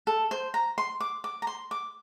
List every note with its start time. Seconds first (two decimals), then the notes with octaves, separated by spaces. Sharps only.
0.07 A4
0.31 C5
0.54 A#5
0.78 C6
1.00 D6
1.24 D6
1.42 A#5
1.47 C6
1.71 D6